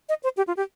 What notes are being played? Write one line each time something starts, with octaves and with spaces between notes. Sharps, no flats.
D#5
C5
G4
F4
G4